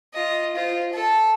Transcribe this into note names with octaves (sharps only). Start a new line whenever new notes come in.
F4 D#5
F4 C5
A4 A5